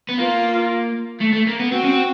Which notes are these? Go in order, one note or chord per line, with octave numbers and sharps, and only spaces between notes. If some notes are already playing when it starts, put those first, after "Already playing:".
B3
A#3 F4
A3
A3
A#3
B3
C4 F#4
C#4
C4